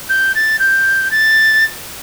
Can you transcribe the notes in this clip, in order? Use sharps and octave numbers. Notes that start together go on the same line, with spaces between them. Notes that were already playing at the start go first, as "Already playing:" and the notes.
G6
A6
G6
A6